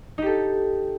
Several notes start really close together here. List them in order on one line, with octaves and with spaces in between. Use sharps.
D#4 G4 A4